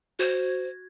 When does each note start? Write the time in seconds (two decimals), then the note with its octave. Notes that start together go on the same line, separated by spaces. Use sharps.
0.19 F#4 C5 G#6